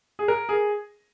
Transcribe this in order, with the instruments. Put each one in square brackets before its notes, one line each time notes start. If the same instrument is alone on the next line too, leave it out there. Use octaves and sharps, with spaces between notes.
[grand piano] G#4
A#4
G#4